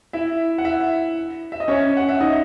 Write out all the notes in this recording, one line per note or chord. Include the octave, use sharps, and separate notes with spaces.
E4 E5
F#5
E4 E5
E5
D#5
C#4 C#5
F#5
E5
D#4 D#5